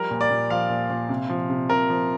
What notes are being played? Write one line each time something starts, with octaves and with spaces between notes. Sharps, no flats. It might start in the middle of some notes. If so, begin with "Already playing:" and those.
Already playing: F3 G3 A#4
A#2
D5
A#2
F3 F5
A#2
A#2
C3
F3
C3
C3 A#4
F3